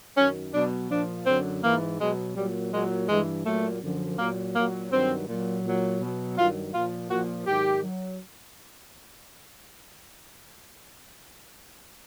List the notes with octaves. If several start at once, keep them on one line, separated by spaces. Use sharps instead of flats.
F#2 D#3 F#3 C#4
B2 F#3 D4
A#2 F3 D4
F#2 D3 F#3 C4
G#2 E3 A#3
B2 F#3 G#3
A#2 F#3 G3
A#2 F#3 G#3
G2 E3 G#3
A#2 F#3 A3
F#2 D3 F3
A#2 F#3 A#3
A#2 F#3 A#3
G2 D#3 F#3 C4
A#2 F#3
A#2 F#3
B2 F#3
G2 D#3 F#3 F4
A#2 F3 F4
A#2 F3 F#4
G#2 D#3 F#3 G4
F#3